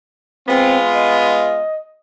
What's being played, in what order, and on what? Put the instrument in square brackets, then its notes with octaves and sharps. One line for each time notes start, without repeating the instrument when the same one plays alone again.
[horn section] G#3 B3 F4 [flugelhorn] C4
[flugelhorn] D#5